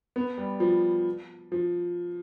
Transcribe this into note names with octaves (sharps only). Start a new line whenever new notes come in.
B3
G3
F3
F3